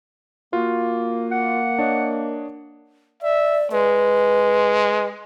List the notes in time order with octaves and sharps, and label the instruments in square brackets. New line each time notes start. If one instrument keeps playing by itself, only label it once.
[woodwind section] A#3 [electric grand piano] F4 F#4
[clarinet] F#5
[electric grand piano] D4 C#5 D#5
[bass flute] D5 [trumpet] E5
[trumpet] G#3 [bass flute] B4